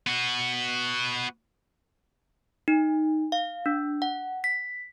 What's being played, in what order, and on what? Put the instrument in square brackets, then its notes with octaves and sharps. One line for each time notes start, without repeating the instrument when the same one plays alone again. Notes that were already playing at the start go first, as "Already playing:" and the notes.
[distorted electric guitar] B3 F#4
[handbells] D#4
F5
D4
F#5
B6